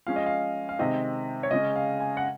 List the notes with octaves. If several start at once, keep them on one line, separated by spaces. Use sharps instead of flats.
F3 G#3 C#4 F5
D#5
F5
F5
C3 D#3 G#3 C4 D#5
C#5
C#3 G#3 C#4 D#5
F5
G#5
F#5